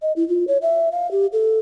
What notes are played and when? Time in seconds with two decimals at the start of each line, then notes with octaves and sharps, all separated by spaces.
0.02 D#5
0.16 E4
0.28 F4
0.48 C#5
0.62 E5
0.92 F5
1.11 G4
1.32 A4